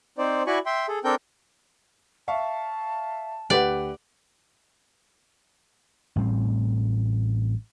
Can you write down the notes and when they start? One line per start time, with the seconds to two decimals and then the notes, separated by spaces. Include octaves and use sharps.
0.18 C4 D#4 C5 D5
0.47 E4 F#4 D5 G#5 B5 C#6
0.66 E5 G5 C6
0.88 G#4 A4
1.04 C4 D4 A4 A#4 G5 G6
2.28 E5 F5 A5 C#6
3.50 D2 G4 B4 D5 F#5
6.16 A1 A2 G3 C4